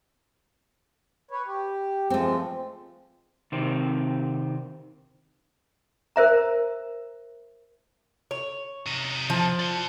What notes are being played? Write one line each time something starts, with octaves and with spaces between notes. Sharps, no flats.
B4 C#5
G4
F3 G#3 A3 C4
C3 D#3 C4
A#4 C5 E5 A#5
C#5
C3 D#4
F3
D5 C6